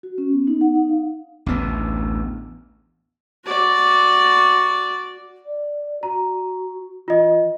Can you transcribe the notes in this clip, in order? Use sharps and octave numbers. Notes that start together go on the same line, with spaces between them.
F#4
C#4
B3
D#4
F#5
D#4
F5
A1 D2 B3
F#4 D5
D5
F#4 A#5
E3 F4 D#5